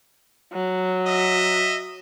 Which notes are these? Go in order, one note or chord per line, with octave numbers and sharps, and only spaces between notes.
F#3
D#5 E5